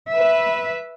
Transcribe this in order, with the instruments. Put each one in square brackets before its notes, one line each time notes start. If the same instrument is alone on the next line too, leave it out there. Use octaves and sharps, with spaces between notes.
[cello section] B4 E5